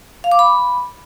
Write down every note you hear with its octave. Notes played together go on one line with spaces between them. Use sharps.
F5
D6
B5